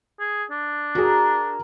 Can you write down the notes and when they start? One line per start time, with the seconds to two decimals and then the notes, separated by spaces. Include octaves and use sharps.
0.20 G#4
0.51 D4
0.95 F#4 G#4 A#4 G5 A#5